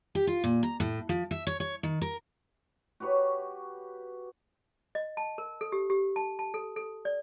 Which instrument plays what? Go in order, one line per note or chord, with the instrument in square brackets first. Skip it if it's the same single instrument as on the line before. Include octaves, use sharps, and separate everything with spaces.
[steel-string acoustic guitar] G4
F4
A#2
A#5
A2
F3
E5
C#5
C#5
D#3
A#4
[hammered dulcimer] F#4 G4 B4 C#5
[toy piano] D#5
A5
A#4
A4
G4
G4
A5
A5
A4
A4
D5